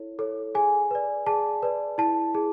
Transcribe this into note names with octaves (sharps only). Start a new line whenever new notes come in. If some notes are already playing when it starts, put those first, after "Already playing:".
Already playing: E4 A4 C#5
A4 C#5
G#4 G#5
B4 D5
G#4 A5
B4 D5
E4 A5
G#4